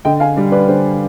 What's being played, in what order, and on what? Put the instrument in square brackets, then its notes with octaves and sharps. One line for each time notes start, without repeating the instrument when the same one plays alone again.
[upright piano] D3 D#5 G5
F5 G#5
G3 D4
B4 D5
D3 C5